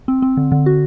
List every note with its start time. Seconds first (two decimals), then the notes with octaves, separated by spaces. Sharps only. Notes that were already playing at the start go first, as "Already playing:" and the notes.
0.08 C4
0.22 C4
0.37 D3
0.52 D3
0.66 F#4